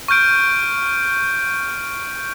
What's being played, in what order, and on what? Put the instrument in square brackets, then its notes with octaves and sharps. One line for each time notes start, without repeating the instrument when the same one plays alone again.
[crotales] C#6 F6 G6 D7